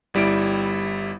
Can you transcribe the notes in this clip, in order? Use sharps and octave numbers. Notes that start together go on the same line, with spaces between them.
G1 G3 E4 D7